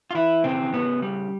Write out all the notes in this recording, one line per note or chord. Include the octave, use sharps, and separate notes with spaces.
F4
E3 E4
C#3 C4
C#3 B3
G3